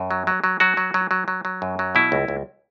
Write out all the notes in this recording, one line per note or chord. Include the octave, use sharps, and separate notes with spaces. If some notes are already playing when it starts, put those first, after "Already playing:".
Already playing: F#2
F#3
F#3
F#3
F#3 F#4
F#3
F#3
F#3
F#3
F#3
F#2
F#3
B2 E4
C#2
C#2